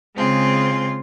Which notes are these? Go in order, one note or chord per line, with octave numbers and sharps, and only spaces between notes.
C#3 G#3 C4 F4